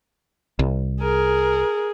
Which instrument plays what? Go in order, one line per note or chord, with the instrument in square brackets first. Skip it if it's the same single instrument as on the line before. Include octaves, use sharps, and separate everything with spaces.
[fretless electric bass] C2
[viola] G#4 [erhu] A#4